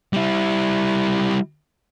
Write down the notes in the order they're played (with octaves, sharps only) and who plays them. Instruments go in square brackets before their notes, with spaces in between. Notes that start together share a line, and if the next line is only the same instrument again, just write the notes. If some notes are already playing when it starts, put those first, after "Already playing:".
[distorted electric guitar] G3 E4